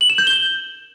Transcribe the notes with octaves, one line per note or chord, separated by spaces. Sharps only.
F#7
E7
G6
G7